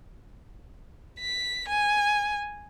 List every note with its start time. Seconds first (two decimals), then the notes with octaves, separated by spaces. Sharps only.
1.20 B6
1.68 G#5